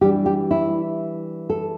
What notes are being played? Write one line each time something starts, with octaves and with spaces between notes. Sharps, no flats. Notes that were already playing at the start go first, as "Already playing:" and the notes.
E3 G3 D4 G4
G4
E4
A4